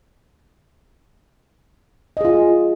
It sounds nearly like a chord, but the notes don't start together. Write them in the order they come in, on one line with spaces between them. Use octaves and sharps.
D#5 G#4 F4